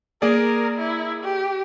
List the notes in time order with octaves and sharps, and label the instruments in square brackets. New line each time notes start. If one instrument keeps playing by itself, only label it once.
[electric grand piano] A#3 G#4 D5 [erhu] A#4
[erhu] E4
G4